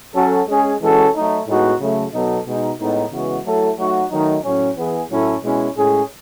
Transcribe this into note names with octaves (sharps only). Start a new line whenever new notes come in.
F#3 C#4 F#4 A4
G#3 C#4 G#4
E3 G#3 C#4 F#4 A4
F#3 A3 D#4
A2 G#3 B3 D#4 F#4
C#3 F#3 A3
B2 F#3 B3 D#4 A4
B2 G#3 D#4
A2 G#3 B3 D#4
C#3 E3 G#3 B3 F#4
F#3 A3 E4 A4
F#3 A3 D#4 F#4
D#3 F#3 A3 D#4
A2 F#3 C#4
E3 B3 E4 G#4
A2 F#3 C#4 E4 A4
B2 G#3 C#4 E4
A2 G#3 C#4 G#4